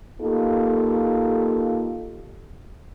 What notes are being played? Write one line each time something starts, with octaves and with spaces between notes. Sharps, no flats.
A#3 D#4 F4 G4 A4